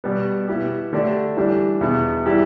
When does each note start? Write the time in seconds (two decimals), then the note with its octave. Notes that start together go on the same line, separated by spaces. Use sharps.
0.04 B2 G3 B3
0.48 B2 B3 E4 G4
0.93 D3 A3 D4 G4
1.37 E3 G3 D4 G4
1.81 E2 B2 B3
2.26 E3 G3 E4 G4